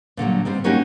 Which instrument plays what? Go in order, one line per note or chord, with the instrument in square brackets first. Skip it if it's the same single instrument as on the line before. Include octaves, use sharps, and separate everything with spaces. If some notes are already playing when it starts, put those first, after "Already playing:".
[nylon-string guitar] A#2 D3 F#3 G3
G#2 G3 C4
A#3 C#4 D#4 F#4 G4